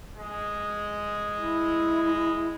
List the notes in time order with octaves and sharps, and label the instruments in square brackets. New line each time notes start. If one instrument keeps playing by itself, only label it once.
[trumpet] G#3
[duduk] E4